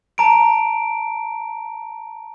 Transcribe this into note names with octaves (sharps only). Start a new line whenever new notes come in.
A5 A#5 D7